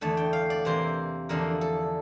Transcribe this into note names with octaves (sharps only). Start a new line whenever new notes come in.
E2 D3 A3 A5
G5
F5
D5
C3 E3 A#3 C5
E2 D3 F3 A#3 D4 A#4
A4